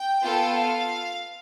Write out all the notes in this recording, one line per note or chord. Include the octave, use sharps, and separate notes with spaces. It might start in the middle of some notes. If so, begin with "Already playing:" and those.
Already playing: G5
B3 F4 A4
F5